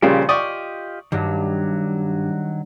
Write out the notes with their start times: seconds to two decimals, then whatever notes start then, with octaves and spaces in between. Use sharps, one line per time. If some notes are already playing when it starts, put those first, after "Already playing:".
0.02 A#1 C#3 G3 G4 C5
0.29 F4 G4 D5 D#5 C#6 D#6
1.12 G2 D#3 F#3